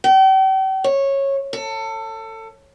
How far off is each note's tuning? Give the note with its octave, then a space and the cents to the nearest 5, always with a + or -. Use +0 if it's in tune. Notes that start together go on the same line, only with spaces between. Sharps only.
G5 -40
C#5 -15
A4 +25